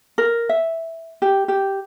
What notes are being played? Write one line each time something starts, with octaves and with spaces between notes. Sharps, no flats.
A#4
E5
G4
G4